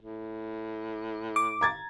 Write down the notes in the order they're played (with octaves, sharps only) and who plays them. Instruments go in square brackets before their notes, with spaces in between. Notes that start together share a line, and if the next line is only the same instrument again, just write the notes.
[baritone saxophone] A2
[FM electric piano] D6
[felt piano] A#5 G#6 A6